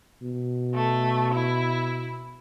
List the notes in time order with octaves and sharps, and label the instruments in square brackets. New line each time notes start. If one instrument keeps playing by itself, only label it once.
[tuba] B2
[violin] A3
E4